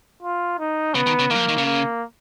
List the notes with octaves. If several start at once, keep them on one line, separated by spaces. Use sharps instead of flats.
F4
D#4
C#3 B3
D#3
C#3
D#3 F#3 A#3
F3
D#3
C#3
A#3